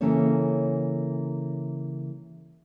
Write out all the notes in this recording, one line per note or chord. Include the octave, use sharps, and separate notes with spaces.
C#3 E3 A#3 C#4 A4 C#5